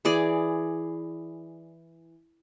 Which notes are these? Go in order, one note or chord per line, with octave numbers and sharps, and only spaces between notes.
E3 G#4 D5